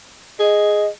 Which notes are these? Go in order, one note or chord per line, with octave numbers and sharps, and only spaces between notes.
G#4 D#5